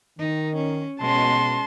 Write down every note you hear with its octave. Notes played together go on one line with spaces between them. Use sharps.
D#3 D#4
C#4
B2 G#3 C#4 A5 C6